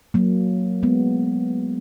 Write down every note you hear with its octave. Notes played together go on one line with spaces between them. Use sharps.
F#3 A#3
G#3 B3